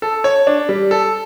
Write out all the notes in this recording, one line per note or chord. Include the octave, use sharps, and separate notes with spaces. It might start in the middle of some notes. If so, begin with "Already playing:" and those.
A4
C#5
D4
G3
A4